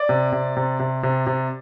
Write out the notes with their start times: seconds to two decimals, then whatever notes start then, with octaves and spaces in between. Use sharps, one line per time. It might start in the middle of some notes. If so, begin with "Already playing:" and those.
Already playing: D5
0.09 C3
0.32 C3
0.57 C3
0.80 C3
1.03 C3
1.27 C3